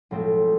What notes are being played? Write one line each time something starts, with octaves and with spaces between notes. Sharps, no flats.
B1 A2 F3 G#3 C4